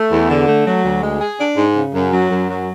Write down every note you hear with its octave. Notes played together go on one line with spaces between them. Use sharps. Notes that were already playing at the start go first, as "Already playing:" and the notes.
Already playing: A3
E2
D3
A3
F#3
D2
G#3
G#4
D4
G#2
C#3
F#2
F#3
F#2
F#3